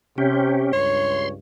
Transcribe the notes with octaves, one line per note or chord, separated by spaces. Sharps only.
C3 C#4 G4
C#2 G2 C#5 C6